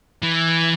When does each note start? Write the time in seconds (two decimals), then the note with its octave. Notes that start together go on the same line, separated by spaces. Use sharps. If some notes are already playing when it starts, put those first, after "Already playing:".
0.22 E3